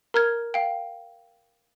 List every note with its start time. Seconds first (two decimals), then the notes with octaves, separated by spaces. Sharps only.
0.14 A#4 A#5 F6 G#6
0.54 F5 G5